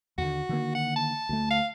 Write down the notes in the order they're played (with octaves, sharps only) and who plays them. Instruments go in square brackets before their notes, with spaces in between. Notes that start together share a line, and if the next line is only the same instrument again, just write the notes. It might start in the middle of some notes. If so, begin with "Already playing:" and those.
[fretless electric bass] D#2 D3 [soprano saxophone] F#4
[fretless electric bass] D3 D#3 A#3
[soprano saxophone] F#5
A5
[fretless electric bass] D2 A3
[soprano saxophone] F5